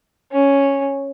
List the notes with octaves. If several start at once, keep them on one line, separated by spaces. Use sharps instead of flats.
C#4